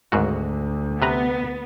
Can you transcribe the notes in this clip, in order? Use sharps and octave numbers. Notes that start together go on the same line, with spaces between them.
G#1 D2 G#2 F#4
C3 B3 B4 A#5